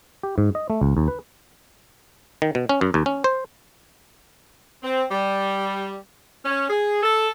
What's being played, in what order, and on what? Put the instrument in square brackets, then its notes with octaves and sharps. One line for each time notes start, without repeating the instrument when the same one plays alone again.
[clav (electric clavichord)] G4
G#2
D#5
A3
C#2
D#2
B4
D#3
B2
C#4
F#2
D#2
C#4
C5
[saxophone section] C4
G3
C#4
G#4
A4